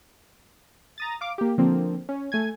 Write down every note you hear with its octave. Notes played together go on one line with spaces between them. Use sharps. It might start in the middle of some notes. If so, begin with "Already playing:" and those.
A#5 D#6 A6
F5 D6
A#3 G4
D3 F3 A#3 C4
C#4
A3 G#5 G#6